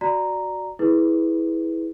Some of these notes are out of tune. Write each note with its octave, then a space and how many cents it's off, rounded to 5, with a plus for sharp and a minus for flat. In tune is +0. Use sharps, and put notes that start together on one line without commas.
F#4 +0 D5 +0 A#5 +0
E4 -15 G#4 +10 B4 +0